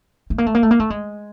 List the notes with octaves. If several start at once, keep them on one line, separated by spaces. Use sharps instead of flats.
A3
A#3
A3
A#3
A3
A#3
A3
G#3